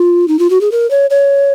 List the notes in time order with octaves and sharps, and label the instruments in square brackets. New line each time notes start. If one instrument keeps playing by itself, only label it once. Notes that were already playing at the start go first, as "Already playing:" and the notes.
Already playing: [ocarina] F4
D#4
F4
F#4
G#4
A#4
C#5
C#5